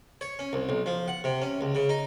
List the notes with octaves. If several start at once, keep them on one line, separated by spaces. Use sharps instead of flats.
C#5
C#4
C2
B1
F3
F#5
C3
C#4
C#2
C#3
D#4